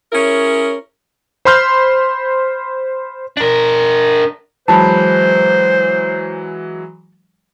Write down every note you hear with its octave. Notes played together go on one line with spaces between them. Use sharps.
C#4 E4 G#4 A#4 C#5
C5 B5 C6 F6 G6
D4 A#4
E3 F#3 G#3 C5 A5 B5